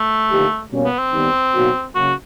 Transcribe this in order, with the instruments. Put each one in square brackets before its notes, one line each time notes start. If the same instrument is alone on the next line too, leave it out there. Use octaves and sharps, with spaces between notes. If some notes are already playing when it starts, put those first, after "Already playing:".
Already playing: [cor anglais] A3
[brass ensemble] D3 F3 A#3 D#4 G4
B2 G3 A#3 C#4
[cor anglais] B3
C4
[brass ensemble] D#3 G3 B3
B2 F#3 A#3 D#4 F#4
[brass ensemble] C#3 F#3 A#3 [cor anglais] F#4